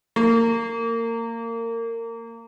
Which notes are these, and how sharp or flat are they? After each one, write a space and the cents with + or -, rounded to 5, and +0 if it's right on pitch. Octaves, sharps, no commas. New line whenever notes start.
A#3 -25